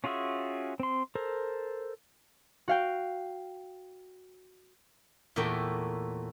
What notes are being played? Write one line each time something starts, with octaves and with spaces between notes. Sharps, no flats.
C#4 F4 F#4 G#4 E5
C4 C6
A4 A#4 C5
F#4 F5 G5
E2 A#2 A3 A#4 C#5 G5